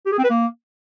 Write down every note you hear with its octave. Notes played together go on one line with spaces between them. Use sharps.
G4
G#4
C4
B4
A#3